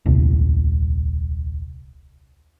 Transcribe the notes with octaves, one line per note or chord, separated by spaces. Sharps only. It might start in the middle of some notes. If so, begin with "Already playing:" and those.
D#1 C2